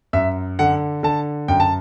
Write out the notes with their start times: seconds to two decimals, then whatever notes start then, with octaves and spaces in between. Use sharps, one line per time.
0.13 F#2 E5
0.59 D3 F#5
1.03 D3 A5
1.48 F#2 G5
1.60 A5